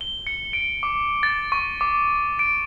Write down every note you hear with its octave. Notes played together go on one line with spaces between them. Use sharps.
G7
C#7
D7
D6
A6
C#6
D6
D7